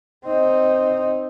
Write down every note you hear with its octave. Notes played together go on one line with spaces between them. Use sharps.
C4 D#4